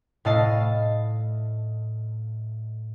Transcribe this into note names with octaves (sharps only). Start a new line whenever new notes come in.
A2 E4 D#5 F5 A5 C7